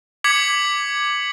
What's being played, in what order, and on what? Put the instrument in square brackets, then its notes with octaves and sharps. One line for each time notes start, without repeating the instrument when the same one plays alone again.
[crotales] D6 G#6 B6 C#7 F#7